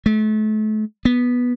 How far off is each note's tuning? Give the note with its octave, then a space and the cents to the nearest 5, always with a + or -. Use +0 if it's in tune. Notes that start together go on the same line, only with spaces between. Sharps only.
A3 -35
B3 -10